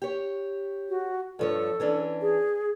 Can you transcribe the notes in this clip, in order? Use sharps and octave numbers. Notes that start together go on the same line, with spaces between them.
G4 C#5
F#4
G2 F3 A4 C#5
E3 C#4 D4
G#4